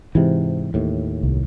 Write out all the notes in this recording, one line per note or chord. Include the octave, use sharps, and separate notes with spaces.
G#2 C3 E3
D#2 A2
C2